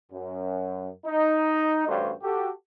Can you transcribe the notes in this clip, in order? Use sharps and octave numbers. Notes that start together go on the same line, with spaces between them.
F#2
D#4
A1 G2 G3 A3 F#4 C5
F#4 G4 A4